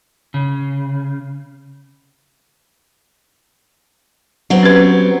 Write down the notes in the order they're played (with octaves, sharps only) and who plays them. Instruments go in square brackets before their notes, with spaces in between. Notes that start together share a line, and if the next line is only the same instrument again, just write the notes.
[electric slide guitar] C#3
[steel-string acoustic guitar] F#3 B3 C4
[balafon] C#4 G4 B4